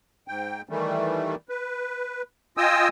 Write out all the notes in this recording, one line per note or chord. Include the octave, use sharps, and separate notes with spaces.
G#2 G5
D#3 E3 G3 A3
B4
F4 D#5 G5 G#5 D#6 E6